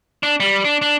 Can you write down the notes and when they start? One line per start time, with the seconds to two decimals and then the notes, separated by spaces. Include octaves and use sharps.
0.23 D4
0.40 G3
0.65 D4
0.82 D4